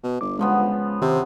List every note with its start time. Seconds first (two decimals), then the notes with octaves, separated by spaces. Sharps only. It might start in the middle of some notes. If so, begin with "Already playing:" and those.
0.03 B2
0.21 G1 D6
0.39 C#3 F3 G#3 B3
1.01 C3 D#3 C5